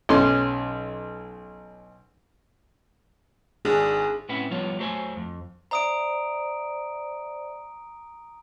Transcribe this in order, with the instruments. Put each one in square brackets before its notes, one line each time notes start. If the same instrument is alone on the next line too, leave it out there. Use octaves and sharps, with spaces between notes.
[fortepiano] B1 C#4 C6
[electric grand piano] G#1 D4 [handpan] G#4
[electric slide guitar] A2 C4 C#4 B4 E5 F#5
F3 G3 B3 F4 C#5
F#3 A3 C5 D5 G#5
F2
[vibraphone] C5 D5 E5 [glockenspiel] A#5 D#6 D7